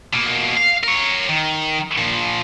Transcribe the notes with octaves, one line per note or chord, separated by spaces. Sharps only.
B2 A#3
F5
A#4 C#5
D#3
A#2 F3